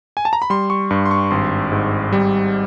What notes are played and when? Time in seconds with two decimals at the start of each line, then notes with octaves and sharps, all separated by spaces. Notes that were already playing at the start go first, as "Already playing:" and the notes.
0.17 G#5
0.25 A5
0.33 A#5
0.42 B5
0.50 G3 C6
0.70 C#6
0.91 G2 C#6
1.06 C6
1.11 C#6
1.31 G#1 C6
1.72 G#2
2.13 G3